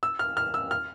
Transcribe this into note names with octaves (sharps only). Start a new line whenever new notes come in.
E6
F6
F6
E6
F6